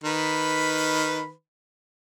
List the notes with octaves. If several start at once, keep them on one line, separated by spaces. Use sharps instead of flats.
D#3 B4 B5